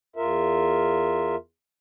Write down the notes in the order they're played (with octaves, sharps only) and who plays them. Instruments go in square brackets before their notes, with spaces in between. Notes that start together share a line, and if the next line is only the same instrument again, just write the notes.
[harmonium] E2 F4 A#4 E5